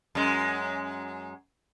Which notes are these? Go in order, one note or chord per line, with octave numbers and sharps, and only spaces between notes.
F#2 G#3